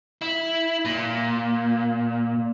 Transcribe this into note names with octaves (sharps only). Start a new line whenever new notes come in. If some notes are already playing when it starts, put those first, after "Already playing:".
E4
A#2